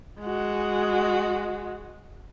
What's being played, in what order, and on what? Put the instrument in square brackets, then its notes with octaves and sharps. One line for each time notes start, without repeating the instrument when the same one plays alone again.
[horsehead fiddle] G#3 F#4